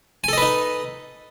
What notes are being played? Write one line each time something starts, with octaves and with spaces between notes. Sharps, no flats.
D#4 A4 B4 D#5 G#5